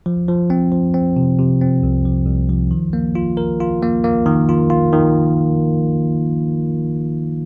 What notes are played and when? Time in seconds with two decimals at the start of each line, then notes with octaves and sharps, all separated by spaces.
0.06 F3
0.28 F3
0.50 C4
0.72 F3
0.94 C4
1.17 C3
1.38 C3
1.61 C4
1.83 C2
2.05 F3
2.26 C2
2.50 F3
2.71 D#3
2.93 A#3
3.15 F4
3.37 A#4
3.60 F4
3.82 A#3
4.04 A#3
4.26 D#3
4.49 F4
4.70 F4
4.93 D#3